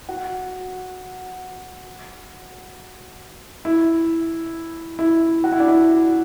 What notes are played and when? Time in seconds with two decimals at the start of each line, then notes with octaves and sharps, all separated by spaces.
0.09 F#4
3.65 E4
4.99 E4
5.44 F#4
5.52 E4
5.60 D4
5.68 E4